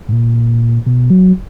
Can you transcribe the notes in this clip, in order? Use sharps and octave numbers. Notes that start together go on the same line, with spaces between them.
G#2
A#2
B2
F#3